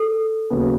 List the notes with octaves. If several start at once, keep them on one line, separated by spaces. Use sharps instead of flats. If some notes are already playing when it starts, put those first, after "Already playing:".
Already playing: A4
D#2 C#3 F#3 B3